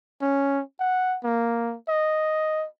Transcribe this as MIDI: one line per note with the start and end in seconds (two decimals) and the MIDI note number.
0.22 0.62 61
0.79 1.17 78
1.24 1.76 58
1.89 2.66 75